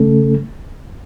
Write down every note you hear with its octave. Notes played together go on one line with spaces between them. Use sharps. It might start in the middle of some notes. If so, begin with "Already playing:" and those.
Already playing: C#3 A3 C#4 A4